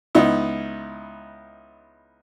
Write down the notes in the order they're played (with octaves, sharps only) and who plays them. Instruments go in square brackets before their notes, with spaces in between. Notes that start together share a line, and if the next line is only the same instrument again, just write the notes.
[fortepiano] C#2 B3 D#4 E4